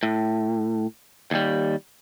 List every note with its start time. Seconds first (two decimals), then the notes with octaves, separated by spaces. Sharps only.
0.03 A2
1.31 D#2 G3